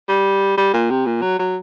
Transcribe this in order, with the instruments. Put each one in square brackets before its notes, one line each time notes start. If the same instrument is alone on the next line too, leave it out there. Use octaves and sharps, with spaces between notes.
[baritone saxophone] G3
G3
A#2
C3
A#2
F#3
F#3